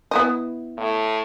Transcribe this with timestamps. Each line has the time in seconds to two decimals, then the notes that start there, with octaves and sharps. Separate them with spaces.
0.11 B3 E4 D#5
0.77 A2